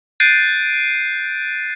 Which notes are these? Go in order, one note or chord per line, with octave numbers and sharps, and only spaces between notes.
F#6 G6 A6 C7 D7 D#7